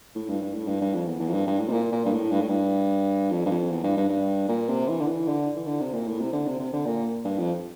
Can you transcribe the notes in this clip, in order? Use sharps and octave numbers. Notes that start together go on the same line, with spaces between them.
A2
G2
G2
A2
G2
G2
F2
E2
E2
F2
G2
G2
A2
C3
A#2
A#2
G2
A2
G2
A2
G2
F2
G2
F2
E2
G2
G2
G2
A#2
C3
E3
D3
E3
D3
E3
D3
C3
A#2
A2
C3
D3
C3
C3
D3
A#2
G2
F2